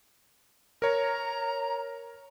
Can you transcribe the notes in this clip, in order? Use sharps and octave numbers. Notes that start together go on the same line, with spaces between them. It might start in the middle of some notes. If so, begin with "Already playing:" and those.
A#4 C#5 A#5